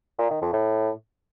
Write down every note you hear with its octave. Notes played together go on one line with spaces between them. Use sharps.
A#2
D#3
F2
A2